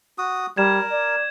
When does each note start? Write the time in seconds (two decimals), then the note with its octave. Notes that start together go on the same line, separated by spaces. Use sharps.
0.18 F#4 D#6
0.57 G3 A#4 G#6 E7
0.91 D5